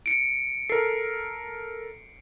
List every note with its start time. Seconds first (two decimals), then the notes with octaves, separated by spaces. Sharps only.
0.06 C#7 D7
0.70 A4 A#4 C7